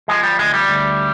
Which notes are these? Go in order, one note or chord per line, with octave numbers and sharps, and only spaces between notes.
F3 G#3
G3
D2 G#3
G3
D2